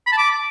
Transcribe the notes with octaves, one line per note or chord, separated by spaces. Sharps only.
B5
A5
D6